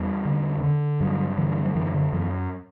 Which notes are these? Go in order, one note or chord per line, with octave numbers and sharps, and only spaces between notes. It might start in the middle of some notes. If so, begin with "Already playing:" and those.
Already playing: E2 G3
D3
D3
G2 F#3
D3 E3
F#3
F#2 E3
D3
F#2 E3